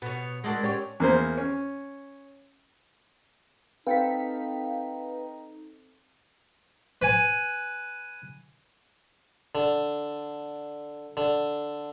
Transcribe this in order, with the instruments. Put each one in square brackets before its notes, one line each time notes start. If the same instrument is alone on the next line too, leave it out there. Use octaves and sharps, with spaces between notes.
[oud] B2 [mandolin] B3 C#5
[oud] G#3 F#4 [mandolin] C4 D4 A#4
[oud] C#4 G4 C#5
[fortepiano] E2 A#3 C5
C#4
[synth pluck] C4 A4 B6 [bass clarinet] D#4 [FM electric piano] B4 F5 G5
[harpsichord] B4 G#5
D3
D3